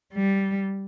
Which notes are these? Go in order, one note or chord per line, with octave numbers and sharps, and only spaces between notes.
G3